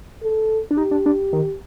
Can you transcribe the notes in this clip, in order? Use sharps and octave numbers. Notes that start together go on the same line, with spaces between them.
A4
D4
D#4 G4
D4
D4
D#3